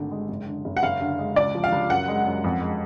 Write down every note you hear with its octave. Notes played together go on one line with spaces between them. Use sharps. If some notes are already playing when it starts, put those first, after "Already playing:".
Already playing: G#1 D3 A3
G#3
F#1
D3
F#1
F#5
F#1 F5
D3
G#3
C#2 D5
F3
F5
C#2
F#2 F#5
G#3
F#2
F2
G#3